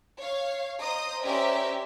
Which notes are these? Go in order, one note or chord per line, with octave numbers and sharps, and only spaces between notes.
C#5 F5
C5 D#5 A#5 D#6
C#4 G4 A#4 C5 D5 E5